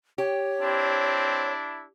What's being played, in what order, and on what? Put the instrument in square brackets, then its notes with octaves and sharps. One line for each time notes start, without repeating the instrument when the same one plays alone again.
[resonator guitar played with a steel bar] G4 [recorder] C#5
[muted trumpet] C4 [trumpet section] D4 E4